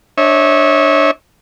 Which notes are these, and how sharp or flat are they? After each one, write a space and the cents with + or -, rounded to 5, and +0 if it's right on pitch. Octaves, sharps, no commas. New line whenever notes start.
D4 +0 C#5 -20 E5 -35